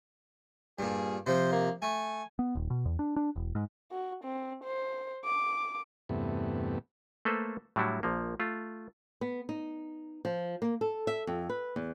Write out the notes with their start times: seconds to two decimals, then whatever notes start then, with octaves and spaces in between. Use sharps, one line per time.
0.79 G2 A#2 G#4
1.27 C3 F3 C5
1.53 A#3
1.82 A3 G#5
2.39 B3
2.55 D#1
2.70 B2
2.85 E2
2.99 D4
3.16 D4
3.36 E1
3.55 G#2
3.91 F#4
4.24 C4
4.64 C5
5.25 D6
6.09 E2 G2 C3 A3 B3
7.25 A3 A#3 A4 B4 C5
7.76 A2 F#3 G3 D4 E4 F#4
8.03 A#1 F3 A#3
8.40 A3 F4
9.21 B3
9.49 D#4
10.25 F3
10.62 A#3
10.81 A4
11.07 E5
11.27 F2
11.49 B4
11.76 E2